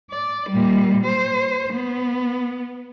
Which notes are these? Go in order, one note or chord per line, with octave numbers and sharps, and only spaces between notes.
D5
A#2 G3
C5
B3